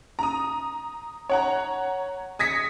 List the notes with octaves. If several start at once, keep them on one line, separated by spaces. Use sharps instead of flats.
A#5 D#6
C#5 F#5 A#5
D#6 G#6 A#6 B6 C#7